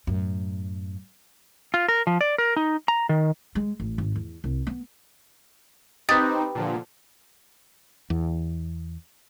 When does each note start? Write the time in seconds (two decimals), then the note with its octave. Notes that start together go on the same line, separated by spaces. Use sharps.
0.07 F#2 A2
1.74 F4
1.88 A#4
2.07 F3
2.21 D5
2.38 A#4
2.56 D#4
2.88 A#5
3.09 D#3
3.55 G#3
3.80 A1
3.98 G#1
4.16 E2
4.44 C2
4.67 B3
6.09 C4 D#4 G4 B4 D#6 A6
6.55 A#2 D3 F3
8.10 E2